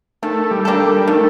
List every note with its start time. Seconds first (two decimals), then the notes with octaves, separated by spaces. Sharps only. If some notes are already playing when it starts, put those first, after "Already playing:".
0.23 D#3 A3
0.51 G3
0.65 A#3 D4 A4
0.80 G3
1.08 D#3 A3